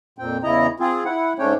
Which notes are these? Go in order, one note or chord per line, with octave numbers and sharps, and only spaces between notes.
F2 A#2 C4 G5
E2 C#3 E4 D#5 A#5
C4 F4 G#4
E4 F#5
G#2 A3 C#4 D4 C#5 G5